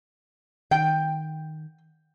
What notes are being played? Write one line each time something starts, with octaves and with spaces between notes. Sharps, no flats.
D#3 G5